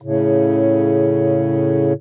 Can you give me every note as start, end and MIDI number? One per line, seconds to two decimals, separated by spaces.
0.02 1.93 45
0.02 1.93 49